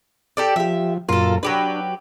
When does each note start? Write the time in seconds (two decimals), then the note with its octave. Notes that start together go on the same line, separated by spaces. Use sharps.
0.37 G4 A4 D5
0.56 F3 G4 E5
1.09 F#2 A#2 F4 A4 A#4
1.43 F#3 D4 G4 B4